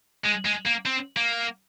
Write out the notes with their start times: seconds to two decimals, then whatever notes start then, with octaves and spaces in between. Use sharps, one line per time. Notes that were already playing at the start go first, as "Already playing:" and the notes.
0.24 G#3
0.45 G#3
0.65 A#3
0.86 C4
1.17 A#3